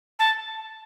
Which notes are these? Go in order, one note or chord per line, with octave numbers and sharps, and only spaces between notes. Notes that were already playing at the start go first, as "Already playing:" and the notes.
A5